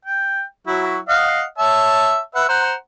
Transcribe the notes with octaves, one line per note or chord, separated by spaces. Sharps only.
G5
F#3 E4 F#4
D#5 F5 F#5
C#5 E5 A5
B4 E5 F#5
C5 F#5 A#5